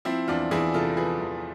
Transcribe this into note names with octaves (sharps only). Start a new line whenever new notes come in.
F3 C4 E4
E2 D4 F4
E2 E4 G#4
C3 F4 A4
F3 G#4 B4
E2